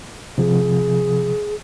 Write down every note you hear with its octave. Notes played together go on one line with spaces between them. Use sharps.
C3 F3 G#4